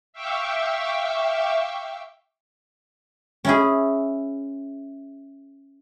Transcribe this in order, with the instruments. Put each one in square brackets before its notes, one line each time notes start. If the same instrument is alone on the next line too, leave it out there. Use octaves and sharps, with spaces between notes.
[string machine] E5 F5 G5 C#6 D6 E6
[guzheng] C#4 E4 G#4